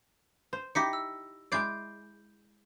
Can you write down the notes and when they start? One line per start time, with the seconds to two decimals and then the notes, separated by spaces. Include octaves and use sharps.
0.53 C5
0.75 D#4 E4 G4 A#6 B6 C#7
0.93 E6
1.52 G#3 E4 D5 G6 C7 D7